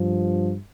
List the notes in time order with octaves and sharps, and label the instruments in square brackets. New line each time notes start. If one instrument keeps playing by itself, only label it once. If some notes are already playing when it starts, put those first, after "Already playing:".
Already playing: [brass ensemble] G2 F3